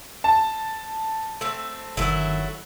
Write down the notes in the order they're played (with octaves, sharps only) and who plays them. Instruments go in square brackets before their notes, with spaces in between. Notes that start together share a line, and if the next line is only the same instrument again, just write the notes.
[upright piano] A5
[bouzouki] A3 C4
[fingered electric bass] G1 G2 D#3 [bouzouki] F#3 A3 E4